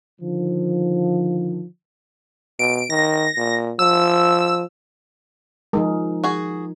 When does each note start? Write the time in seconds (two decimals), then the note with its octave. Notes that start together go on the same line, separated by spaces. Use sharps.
0.20 D3 D#3 F3
2.59 B2 D7
2.90 D#3 A#6
3.37 A#2
3.79 F3 E6
5.73 F3 G#3 D#4 A#4
6.24 F#4 G#4